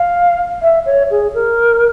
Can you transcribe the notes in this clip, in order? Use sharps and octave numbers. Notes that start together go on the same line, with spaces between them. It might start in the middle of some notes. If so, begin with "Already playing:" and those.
Already playing: F5
E5
C#5
G#4
A#4